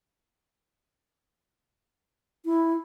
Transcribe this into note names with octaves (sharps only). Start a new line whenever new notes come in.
E4